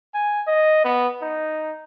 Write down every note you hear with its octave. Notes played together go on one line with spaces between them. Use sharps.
G#5
D#5
B3
D#4